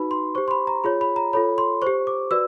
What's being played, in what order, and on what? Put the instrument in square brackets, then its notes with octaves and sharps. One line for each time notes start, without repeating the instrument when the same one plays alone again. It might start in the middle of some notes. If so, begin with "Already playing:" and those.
Already playing: [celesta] D#4 F#4 B4 B5
C6
G4 C5 C#6
C6
B5
A#5
F4 G#4 C#5 B5
B5
A#5
F4 A4 C#5 B5
C6
G4 C5 C#6
D6
F#4 B4 D5 E6